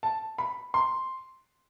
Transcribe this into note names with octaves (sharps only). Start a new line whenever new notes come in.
A5
B5
C6